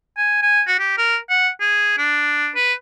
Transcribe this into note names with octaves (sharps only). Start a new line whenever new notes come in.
G#5
G#5
F#4
G4
A#4
F#5
G#4
D4
B4